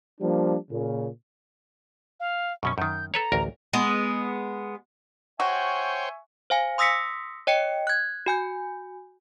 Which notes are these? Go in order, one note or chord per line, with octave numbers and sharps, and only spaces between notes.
F3 G3 A#3 D4
A#2 C#3
F5
F#2 B2 C#4 C#6
F#2 D#3 G6
A4 B4 C#5 A#5
A1 D2 A#4
G#3 B3
F#4 C5 C#5 E5 G5 G#5 C#6
C5 F5 G#5
C6 D#6 E6 A#6 B6 C#7
C#5 D#5 G5 C#7
F#6 G#6
F#4 G#5 G6